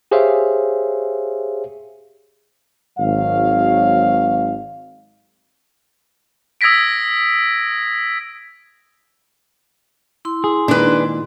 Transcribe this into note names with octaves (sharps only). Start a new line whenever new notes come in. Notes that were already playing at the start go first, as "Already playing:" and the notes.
G4 G#4 C5 C#5 E5 F5
G#1 F#3 F5
D#6 E6 G#6 A#6 B6 D7
E4 C6
G#4
A#2 D#3 G#3 D4 B4